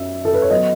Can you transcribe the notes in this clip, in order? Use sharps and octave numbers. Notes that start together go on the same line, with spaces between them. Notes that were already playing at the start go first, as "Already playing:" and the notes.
Already playing: F#2 E5
A4
B4
C#5
F#3 B3 D#5